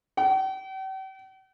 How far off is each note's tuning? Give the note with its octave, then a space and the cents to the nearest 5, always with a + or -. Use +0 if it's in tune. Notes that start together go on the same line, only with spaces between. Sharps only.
G5 -45